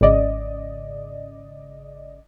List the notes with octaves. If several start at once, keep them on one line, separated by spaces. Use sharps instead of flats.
G#1 C#3 D5 D#5